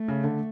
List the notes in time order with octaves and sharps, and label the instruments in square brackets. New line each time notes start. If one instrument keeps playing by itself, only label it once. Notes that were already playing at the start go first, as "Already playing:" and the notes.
Already playing: [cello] A3
[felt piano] C#3
D3